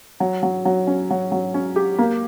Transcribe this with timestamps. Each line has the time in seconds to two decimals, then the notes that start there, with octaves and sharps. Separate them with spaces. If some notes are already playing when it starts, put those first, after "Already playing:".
0.20 F#3
0.43 F#3
0.65 F#3
0.87 C#4
1.10 F#3
1.32 F#3
1.54 C#4
1.76 G4
1.98 A#3